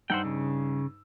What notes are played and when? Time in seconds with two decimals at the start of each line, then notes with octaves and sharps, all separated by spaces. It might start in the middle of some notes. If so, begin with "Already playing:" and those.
0.10 G2 D#4 C5 F#5 G5 E6
0.25 C#3